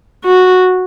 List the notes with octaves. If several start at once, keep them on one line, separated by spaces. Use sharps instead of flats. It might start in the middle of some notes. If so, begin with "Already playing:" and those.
F#4